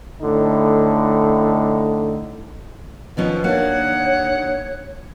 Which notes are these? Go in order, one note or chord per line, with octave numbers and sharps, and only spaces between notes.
A2 D3 D#4
B2 D#3 F3 C#4
D#2 A#3 D4 C#5 F#5